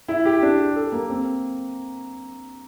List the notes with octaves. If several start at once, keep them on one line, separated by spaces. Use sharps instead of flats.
E4
G4
D4
G4
A4
A#3
C4